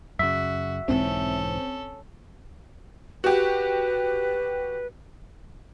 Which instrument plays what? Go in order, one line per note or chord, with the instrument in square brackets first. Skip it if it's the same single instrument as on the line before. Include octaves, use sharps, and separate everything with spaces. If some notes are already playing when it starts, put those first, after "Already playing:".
[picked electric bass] F#2 C#3 [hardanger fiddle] F#4 [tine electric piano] E5
[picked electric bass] B1 G#2 E3 [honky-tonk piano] C4 [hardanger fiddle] C#4 A4
[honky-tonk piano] F#4 G4 [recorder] B4